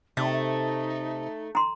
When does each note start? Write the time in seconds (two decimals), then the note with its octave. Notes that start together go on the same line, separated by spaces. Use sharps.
0.17 C3 A3 D#4
1.55 A#5 C6